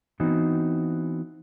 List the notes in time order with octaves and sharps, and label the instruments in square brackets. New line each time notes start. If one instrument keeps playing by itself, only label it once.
[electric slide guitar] E3 B3 C4 D#4 F#4